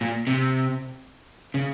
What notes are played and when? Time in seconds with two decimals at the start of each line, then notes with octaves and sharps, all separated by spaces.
0.01 A#2
0.27 C3
1.54 C#3